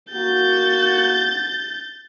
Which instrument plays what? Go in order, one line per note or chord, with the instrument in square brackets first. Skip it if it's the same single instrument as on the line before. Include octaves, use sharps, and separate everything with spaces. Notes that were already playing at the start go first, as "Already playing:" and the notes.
[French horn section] A#3 F#4 [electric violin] G6 A6